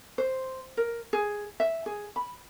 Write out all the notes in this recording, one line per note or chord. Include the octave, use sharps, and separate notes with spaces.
C5
A#4
G#4
E5
G#4
B5